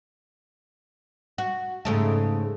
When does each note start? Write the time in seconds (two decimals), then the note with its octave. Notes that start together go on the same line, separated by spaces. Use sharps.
1.38 F#4
1.85 G#2 C#3 A3